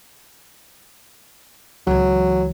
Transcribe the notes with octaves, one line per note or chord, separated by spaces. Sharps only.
C#2 E3 F#3